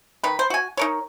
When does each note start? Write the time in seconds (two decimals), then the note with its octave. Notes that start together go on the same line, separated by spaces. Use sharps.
0.23 D#3 B4
0.39 C5
0.50 F#4 G#5
0.77 D#4 A#4 C#5